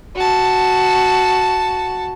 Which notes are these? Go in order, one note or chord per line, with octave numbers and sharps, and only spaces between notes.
F#4 A5